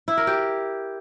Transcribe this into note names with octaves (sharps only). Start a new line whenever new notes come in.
E4
A#4
G4